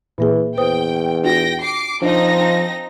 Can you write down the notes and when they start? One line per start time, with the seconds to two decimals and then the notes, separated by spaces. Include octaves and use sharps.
0.18 A#2 E3 A#3 G#4
0.57 E2 B4 C5 G5 D#6
1.24 D4 F4 F#4 G5 A#6
1.62 D6 C7
2.02 F3 C4 D4 D#4 A#6